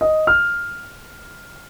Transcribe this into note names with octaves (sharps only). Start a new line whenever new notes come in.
D#5
F6